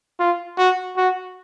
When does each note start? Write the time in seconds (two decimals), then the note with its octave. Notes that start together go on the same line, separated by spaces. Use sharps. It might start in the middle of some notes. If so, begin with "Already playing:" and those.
0.19 F4
0.58 F#4
0.97 F#4